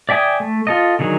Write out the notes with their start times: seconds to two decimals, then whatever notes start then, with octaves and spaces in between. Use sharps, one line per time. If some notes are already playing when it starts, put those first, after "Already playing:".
0.09 D5 E5 G5 G#5 D#6
0.40 A3
0.67 F4 A4 D#5
0.99 D3 D#3 F#3 G#4